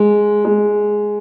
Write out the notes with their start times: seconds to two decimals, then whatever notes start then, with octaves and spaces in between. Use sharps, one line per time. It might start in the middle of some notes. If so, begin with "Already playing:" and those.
Already playing: G#3
0.45 G#3